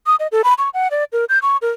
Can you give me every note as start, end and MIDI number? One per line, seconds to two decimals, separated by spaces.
0.06 0.16 87
0.20 0.27 75
0.32 0.42 69
0.44 0.54 83
0.58 0.69 85
0.74 0.88 78
0.91 1.04 74
1.13 1.25 70
1.29 1.39 91
1.42 1.57 85
1.62 1.71 70